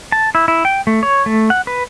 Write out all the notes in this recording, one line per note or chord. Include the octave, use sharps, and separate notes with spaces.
A5
E4
E4
G5
A3
C#5
A3
F#5
B4